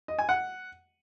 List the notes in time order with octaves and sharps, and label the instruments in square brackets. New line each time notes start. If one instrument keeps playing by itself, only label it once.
[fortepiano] D#5
G#5
F#5